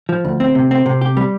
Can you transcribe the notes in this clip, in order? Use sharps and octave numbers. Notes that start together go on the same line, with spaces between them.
F3
D2
C4
C3
C4
C3
G4
G3